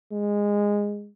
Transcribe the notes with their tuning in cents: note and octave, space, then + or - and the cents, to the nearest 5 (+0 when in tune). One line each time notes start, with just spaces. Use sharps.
G#3 -15